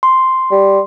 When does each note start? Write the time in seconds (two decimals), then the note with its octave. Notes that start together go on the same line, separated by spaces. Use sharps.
0.03 C6
0.51 G3